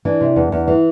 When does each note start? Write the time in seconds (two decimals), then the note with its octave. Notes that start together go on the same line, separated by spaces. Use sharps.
0.05 E3 D4
0.21 C3
0.36 E2
0.52 E2
0.68 E3